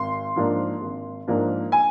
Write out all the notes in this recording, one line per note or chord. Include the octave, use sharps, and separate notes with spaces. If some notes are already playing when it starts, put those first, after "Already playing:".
Already playing: G#1 C6
G#2 F3 A#3 D4
G#1
G#2 F3 A#3 D4
G#5